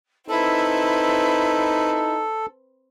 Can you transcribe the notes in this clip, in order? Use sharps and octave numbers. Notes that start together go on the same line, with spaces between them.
C4 D#4 E4 A4 B4